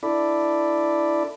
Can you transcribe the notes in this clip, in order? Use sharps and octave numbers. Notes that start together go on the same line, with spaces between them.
D4 E4 A4 D5 B5